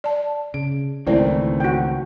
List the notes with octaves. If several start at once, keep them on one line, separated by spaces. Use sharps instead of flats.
D5 A5
C#3 D7
G#1 C#2 E3 A3 A#3 C4 E4 D5
F#4 G5